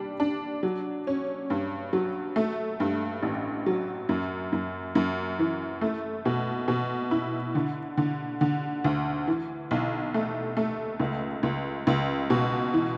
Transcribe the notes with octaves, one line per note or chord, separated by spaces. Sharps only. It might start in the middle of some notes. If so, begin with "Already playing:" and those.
Already playing: G3 D4
D4
F#3
C#4
G2
F#3
A3
G2
A1
F#3
F#2
F#2
F#2
E3
A3
B2
B2
E4
D3
D3
D3
D2
E3
B1
A3
A3
C#2
C#2
C#2
B2
E3